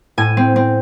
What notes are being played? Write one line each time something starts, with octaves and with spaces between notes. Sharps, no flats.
A2 G#5
C4
C4